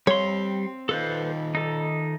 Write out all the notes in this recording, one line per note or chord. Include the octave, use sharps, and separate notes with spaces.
G3 C4 C#5 F5 C6
D#3 F4 A4 B4 C5
D#4 A4